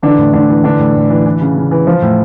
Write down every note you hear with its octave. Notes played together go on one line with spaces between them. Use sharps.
D3 E3 D4
A2
A2 D3 D4
E3
D3 E3 D4
A2
A2
E3
E3
C#3
C#3
E3
F3
A2